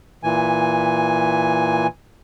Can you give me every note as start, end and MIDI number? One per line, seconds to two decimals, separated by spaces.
0.23 1.87 46
0.23 1.87 52
0.23 1.87 80